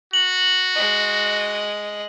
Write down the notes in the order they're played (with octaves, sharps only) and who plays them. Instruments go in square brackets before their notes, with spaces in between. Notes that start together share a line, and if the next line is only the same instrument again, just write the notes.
[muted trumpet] F#4 [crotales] F#7
[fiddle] G#3 D#5